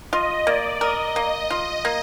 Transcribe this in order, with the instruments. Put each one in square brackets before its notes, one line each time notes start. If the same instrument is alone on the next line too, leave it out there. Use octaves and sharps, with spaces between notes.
[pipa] F4 [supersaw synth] D#5
[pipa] A#3 [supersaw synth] D5
[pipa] A#4 [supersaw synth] D#5
[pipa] A#3
F4
A#3